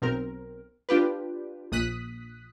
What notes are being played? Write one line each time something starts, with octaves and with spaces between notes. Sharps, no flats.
B1 C4 A#4
D4 F4 G4 B4
A#1 D#6 F#6 B6